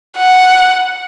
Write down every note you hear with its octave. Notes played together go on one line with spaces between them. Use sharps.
F#5